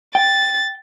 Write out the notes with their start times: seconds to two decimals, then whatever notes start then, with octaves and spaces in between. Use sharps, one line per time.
0.15 G5 A6